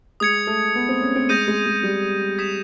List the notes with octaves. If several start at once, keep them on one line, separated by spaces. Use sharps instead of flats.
G#3 D#6 G#6 C#7
A3
B3
C4
C#4
C4
G#3 D#6 G6 A#6 D#7
G#3
G#3
G3
D#6 G#6 B6 E7